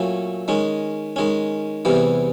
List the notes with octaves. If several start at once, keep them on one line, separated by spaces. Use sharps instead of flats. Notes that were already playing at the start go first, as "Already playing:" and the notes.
Already playing: A#2 F#3 A3 C#4
D#3 G#3 C#4
D#3 G#3 C#4
E2 C3 E3 G3